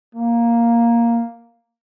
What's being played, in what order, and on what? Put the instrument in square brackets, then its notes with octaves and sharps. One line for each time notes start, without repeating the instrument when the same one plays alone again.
[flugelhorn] A#3